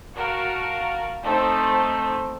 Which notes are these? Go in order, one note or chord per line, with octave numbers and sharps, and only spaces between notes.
F#4 A#4 F5 A5
A3 C4 D#4 A4 C5